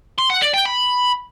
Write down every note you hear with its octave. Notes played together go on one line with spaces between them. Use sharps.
C6
F#5
D5
G5
B5